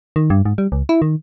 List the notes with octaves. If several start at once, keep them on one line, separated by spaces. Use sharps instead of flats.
D#3
G2
G#2
G3
C#2
E4
D#3